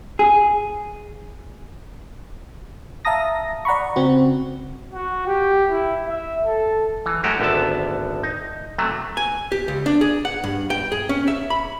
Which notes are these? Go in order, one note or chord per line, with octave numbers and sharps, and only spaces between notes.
G#4
E5 F5 A5 A#5 D#6 A#6
D5 F#5 A#5 B5 C#6
C#3 C4 F#4
F#4
G4
E4
E5
A4
E3
F#2 G#3 A3 F#4 G4
G#1 D2 D3 B3 A5
D#4
C3 F#3 A3
G#5
G4
C#2
D4
G#4
F#5
G2
G5
G#4
C#4
E5
B5